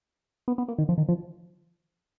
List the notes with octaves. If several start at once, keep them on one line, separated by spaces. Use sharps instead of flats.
B3
B3
A#3
D#3
F3
D#3
F3